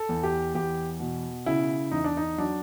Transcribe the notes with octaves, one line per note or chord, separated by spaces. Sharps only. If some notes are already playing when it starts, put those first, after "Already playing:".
Already playing: A4
E2
G4
E2 G4
B2
C#3 E4
E2 D#4
D4
D#4
F#3 D4